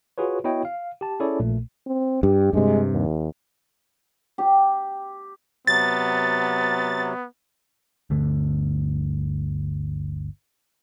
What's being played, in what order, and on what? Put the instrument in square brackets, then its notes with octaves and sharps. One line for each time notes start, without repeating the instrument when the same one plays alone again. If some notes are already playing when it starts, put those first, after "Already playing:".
[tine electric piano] F4 F#4 G#4 B4 C#5
B3 E4 F#4 C#5 D#5 G5
F5
G4 A5
C#4 E4 G#4 A4 C#5 D5
A#1 A#2 A3
[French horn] C4
[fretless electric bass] G2 [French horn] G4
[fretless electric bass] G2 C3 [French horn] G#3
[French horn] D#2
[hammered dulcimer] G4
[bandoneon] C3 F#3 [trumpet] B3 [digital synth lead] A6
[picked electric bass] G1 D2 D3 A3